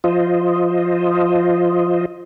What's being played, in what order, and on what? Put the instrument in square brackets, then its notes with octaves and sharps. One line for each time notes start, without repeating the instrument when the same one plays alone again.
[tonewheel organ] F3 F4 C5 D#5